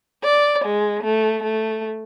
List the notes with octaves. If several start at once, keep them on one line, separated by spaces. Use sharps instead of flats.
D5
G#3
A3
A3